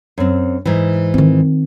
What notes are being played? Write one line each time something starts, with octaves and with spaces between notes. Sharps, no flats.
F#2 C4
G#2 E3
D#3 C4